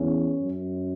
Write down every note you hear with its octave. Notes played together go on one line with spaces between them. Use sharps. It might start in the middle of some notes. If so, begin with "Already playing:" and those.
Already playing: E2 C#4
F#2